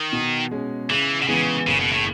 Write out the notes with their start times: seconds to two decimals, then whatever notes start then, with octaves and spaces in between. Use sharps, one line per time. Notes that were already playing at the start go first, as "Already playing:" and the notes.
Already playing: D#3
0.13 B2
0.51 G#3 C#4
0.90 C#3 E3
1.23 B2
1.28 C#3 E3 G#3 B3
1.67 F#1 C#3
1.80 B2
1.93 A2